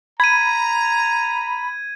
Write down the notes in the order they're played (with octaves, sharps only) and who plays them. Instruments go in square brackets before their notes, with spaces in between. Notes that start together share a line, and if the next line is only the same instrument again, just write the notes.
[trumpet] A#5 [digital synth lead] B5 [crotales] G#6 D#7